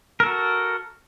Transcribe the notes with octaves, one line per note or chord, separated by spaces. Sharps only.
F#4 A4 A#4